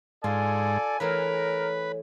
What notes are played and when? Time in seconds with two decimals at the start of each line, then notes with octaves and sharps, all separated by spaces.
0.24 G#2 F4 A4 D5 G#5
1.00 E3 A3 G#4 A#4 B4 C#5